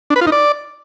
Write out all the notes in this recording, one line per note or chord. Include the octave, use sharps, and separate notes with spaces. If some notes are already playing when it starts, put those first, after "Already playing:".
D4
B4
F4
D#4
D5